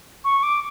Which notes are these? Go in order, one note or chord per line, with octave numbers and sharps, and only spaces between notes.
C#6
D6